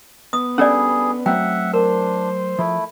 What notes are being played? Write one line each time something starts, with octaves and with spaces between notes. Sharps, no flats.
B3 D#6
G3 C#4 D4 G#4 A4 D5 F#5
F#3 A3 C4 E5 F#5 G5
D4 A#4 C5
F3 A3 E4